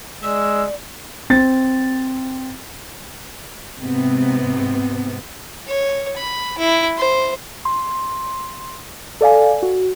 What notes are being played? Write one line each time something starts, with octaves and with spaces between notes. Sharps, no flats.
G#3 D5 E6
C4 A6
G#2 C3 B3 C4
C#5
B5
E4
C5
C6
A4 D5 F5 G#5
F#4